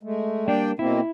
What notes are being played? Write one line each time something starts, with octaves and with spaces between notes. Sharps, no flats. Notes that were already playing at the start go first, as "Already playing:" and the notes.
G#3 A3
G3 A#3 D4 D5 G5
B2 A#3 C4 E4